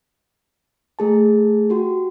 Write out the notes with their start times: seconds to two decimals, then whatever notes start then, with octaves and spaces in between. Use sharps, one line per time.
0.99 A3 G#4 A5
1.70 F#4 G4